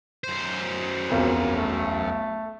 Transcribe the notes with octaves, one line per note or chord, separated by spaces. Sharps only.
F#2 C5
E1 B1 F2 A#4
A3